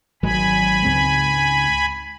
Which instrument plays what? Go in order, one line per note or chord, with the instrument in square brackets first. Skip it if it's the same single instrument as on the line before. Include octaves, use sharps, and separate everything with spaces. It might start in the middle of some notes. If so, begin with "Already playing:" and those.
[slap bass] G#1 F#3 G#3 [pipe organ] G#5 B5
[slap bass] C#2 G#2 C4